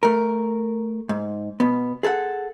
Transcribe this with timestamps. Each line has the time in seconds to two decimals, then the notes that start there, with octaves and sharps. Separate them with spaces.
0.03 A3 A#4
1.09 G#2
1.60 B2 B3
2.03 G#4 A4 E5 F#5